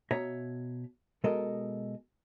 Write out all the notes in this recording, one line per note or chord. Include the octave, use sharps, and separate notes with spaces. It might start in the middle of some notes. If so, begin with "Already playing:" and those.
B2 C#5 E5 A#5
B2 G#3 A4 A#4 D#5